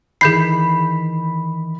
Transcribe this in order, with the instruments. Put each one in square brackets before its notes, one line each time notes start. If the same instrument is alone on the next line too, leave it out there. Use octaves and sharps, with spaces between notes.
[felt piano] D#3 E3 [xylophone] G#4 G6 C7 [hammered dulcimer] B5